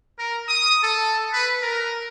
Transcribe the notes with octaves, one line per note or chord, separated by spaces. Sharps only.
A#4
D#6
A4
B4
A#4